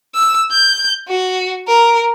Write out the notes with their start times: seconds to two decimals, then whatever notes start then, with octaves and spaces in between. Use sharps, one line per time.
0.15 E6
0.52 G6
1.08 F#4
1.68 A#4